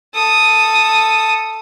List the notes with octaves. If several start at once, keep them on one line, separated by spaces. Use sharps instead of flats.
A4 D#6